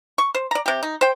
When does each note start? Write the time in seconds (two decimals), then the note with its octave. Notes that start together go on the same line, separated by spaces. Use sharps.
0.18 C#6
0.35 C5
0.51 D5 A#5
0.66 C3 G4
0.83 D#4
1.01 C5 G5